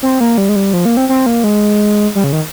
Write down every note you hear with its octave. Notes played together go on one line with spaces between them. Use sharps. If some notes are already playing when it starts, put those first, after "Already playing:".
C4
A#3
G3
G#3
G3
F3
A#3
C4
C4
A#3
G#3
G3
C#3
D#3